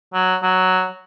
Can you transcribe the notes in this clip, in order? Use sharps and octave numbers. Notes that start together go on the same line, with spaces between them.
F#3
F#3